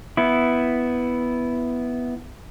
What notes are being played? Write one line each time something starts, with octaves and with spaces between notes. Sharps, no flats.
B3 E4